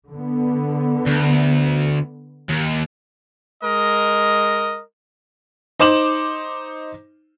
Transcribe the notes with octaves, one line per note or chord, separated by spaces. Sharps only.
D3 B3
D2
D#2
G#3 A#4 D#5
D#4 C5 D6 E7 F#7